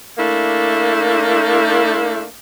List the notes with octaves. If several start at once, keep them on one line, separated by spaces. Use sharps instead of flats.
A3 A#3 D4 E4